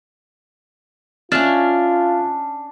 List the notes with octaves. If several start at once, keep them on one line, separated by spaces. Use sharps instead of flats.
C#4 D4 F4 E5 F6 A6